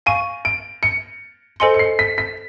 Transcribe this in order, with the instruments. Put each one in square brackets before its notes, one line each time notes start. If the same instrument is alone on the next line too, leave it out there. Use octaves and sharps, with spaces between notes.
[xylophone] F5 G#5 C#6 [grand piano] D#7
[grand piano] D7
C#7
[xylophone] A4 C5 D#5 G#5 C6 [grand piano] C#7
[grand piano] C#7
C7
B6
B6